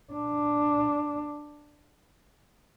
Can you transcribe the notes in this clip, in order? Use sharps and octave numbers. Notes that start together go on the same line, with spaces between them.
D4